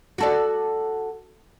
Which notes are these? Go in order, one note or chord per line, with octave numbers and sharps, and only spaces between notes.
F#4 A4 D5